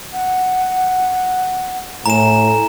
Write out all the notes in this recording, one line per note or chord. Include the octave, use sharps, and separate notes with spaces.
F#5
A2 G#5 A#5 E7